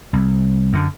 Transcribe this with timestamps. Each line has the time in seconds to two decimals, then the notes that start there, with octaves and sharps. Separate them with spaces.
0.13 C2
0.73 F#2 D3